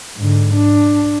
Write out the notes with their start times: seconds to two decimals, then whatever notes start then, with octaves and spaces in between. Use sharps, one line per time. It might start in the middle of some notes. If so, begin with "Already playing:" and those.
0.17 G#2 D3
0.55 D4